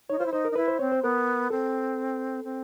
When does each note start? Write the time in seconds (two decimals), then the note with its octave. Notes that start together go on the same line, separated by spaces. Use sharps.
0.09 D#4 C#5
0.18 F4 C5
0.26 E4
0.32 D#4 C5
0.45 A#4
0.51 D#4
0.55 E4 B4
0.68 C5
0.79 C4 C#5
0.92 C5
1.03 B3 A#4
1.50 C4 A4
2.44 C4